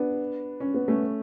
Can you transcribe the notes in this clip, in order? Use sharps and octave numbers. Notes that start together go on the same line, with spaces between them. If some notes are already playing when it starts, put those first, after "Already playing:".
Already playing: B3 D4
C#4
B3
A3 C#4